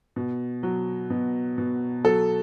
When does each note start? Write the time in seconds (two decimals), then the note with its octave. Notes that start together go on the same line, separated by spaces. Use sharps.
0.16 B2
0.63 F#3
1.10 B2
1.58 B2
2.04 F#3 A4